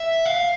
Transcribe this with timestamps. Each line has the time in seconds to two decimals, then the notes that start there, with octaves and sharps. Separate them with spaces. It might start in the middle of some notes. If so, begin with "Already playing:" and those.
Already playing: E5
0.25 F5